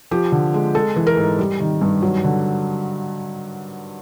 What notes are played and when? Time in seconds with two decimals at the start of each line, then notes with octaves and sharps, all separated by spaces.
0.11 F3 G4
0.32 D3
0.54 G#3
0.75 G#3 A4
0.96 E3
1.07 A#4
1.17 G#2
1.39 G3
1.60 D#3
1.81 G2
2.03 F#3
2.24 D3